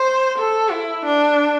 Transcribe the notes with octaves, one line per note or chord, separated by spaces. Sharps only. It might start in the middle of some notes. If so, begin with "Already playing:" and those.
Already playing: C5
A4
E4
D4